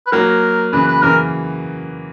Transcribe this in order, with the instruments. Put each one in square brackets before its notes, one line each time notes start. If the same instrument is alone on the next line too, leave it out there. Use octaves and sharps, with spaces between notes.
[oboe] B4
[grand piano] F#3 A#3 [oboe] A#4
[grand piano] C#3 E3 [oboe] B4
[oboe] B4
[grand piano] C#3 E3 [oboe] A#4